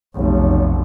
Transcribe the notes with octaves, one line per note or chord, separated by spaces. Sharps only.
F1 B1